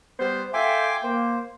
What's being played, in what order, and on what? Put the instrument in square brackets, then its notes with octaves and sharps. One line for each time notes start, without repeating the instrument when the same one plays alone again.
[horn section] G3 B3 C5
[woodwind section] F4 A4 E5 [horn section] G5 [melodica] G#5 C6 D6
[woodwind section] A#3 [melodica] C5